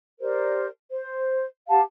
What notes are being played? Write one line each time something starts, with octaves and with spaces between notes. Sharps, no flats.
G4 A#4 C5 D5
C5
G4 F5 F#5 A5